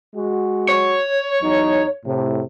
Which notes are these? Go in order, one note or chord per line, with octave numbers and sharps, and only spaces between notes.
G#3 F#4
C#5
E2 F#3 D#4
A2 C3